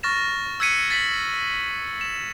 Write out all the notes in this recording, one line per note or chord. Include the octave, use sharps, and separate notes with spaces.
C#6 F6 A6 A#6 E7
E6 F#6 G#6 B6 C#7 D#7
A6 B6 F#7
E7